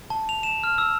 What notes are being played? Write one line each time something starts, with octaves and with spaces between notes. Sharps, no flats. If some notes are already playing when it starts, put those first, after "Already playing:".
A5
F7
E7
F6
E6